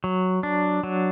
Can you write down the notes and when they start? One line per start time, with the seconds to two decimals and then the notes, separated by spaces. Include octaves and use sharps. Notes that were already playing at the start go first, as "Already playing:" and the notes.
0.04 F#3
0.43 D4
0.83 F#3